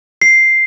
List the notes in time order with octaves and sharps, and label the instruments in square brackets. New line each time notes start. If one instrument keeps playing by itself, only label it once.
[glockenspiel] C7